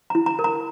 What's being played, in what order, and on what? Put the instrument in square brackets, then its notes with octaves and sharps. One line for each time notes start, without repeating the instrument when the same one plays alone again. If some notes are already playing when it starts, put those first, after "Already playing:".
[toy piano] E4 A#5
A#5
A#4
A#5